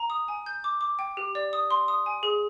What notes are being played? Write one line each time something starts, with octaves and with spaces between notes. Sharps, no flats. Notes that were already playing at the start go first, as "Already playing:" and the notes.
Already playing: A#5
D#6
G#5
G6
D6
D6
G5
G4
D5
D#6
C6
D#6
G#5
G#4